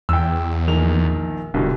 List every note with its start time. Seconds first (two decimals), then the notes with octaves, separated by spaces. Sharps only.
0.09 E2 G5 E6
0.68 A#1 D#3 F7
1.54 E1 C2 B2 D3